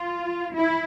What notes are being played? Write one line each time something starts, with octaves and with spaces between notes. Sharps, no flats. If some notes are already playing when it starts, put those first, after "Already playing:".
Already playing: F4
E4